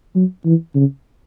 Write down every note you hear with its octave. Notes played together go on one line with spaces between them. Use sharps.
F#3
E3
C#3